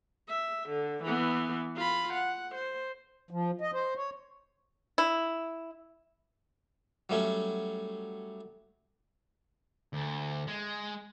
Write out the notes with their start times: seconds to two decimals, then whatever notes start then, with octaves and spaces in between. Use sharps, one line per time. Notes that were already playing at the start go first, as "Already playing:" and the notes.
0.29 E5
0.69 D3
1.03 E3 B3
1.76 F4 B5
2.13 F#5
2.55 C5
3.31 F3
3.61 D#5
3.73 C5
3.96 C#5
4.98 E4
7.09 F#3 G3 A3 C#4
9.93 D2
10.48 G#3